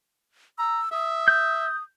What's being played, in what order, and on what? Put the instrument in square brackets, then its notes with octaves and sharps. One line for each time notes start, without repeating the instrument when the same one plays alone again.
[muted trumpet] A#5 [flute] E6
[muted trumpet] E5 [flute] D#6
[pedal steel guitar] G6